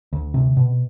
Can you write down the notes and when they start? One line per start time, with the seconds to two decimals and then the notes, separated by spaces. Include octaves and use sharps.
0.13 D2
0.34 C3
0.57 B2